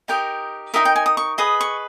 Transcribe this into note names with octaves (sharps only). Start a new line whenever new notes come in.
D#4 G4 A#4 D#5 G5
D#4 G4 A#4 D#5 E5
G5
G#5
D#6
C#6
G#4 B4 D#5 D#6
C#6